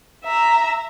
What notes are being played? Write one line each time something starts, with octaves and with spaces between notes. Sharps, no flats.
E5 A#5